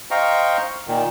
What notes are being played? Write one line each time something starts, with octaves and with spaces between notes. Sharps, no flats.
C5 D#5 F5 G5 A#5 C#6
A#2 D#3